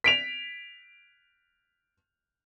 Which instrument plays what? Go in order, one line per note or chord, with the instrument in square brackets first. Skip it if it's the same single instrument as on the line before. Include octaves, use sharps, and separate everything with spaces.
[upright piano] B6 D7 F7